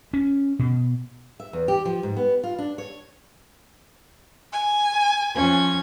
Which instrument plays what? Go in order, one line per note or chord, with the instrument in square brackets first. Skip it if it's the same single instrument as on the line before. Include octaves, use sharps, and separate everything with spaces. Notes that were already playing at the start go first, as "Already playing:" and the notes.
[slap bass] C#4
B2
[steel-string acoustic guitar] E5
E2
G4
F3
G#2
B3
F4
D4
C#5
[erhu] G#5
[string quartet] F2 C#4 G#6